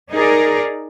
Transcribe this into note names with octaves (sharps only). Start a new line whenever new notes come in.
D#4 G#4 A#4 D5